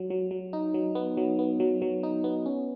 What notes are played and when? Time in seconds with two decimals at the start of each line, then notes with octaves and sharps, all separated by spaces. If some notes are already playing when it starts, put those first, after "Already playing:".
Already playing: F#3
0.10 F#3
0.31 F#3
0.53 D#4
0.74 F#3
0.95 B3
1.17 F#3
1.39 B3
1.60 F#3
1.82 F#3
2.03 D#4
2.24 B3
2.46 C#4